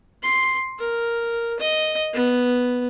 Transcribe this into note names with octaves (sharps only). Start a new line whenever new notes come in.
C6
A#4
D#5
B3